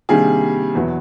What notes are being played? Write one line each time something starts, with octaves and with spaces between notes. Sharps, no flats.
C3 D#3 G3 A#3 D4 G#4
E2 B2 F#3 B3 E4